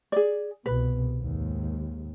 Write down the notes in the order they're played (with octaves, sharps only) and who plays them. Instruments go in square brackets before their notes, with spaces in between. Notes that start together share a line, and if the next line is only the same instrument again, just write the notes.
[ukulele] G#4 D5
[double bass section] C2 B2 [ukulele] B4
[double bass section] D#2 G#2